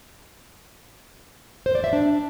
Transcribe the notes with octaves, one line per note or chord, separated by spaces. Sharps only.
C5
D5
E5
D4